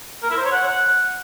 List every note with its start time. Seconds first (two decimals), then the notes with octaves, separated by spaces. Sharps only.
0.23 A#4
0.30 E4
0.37 C5
0.45 C#5
0.52 F#5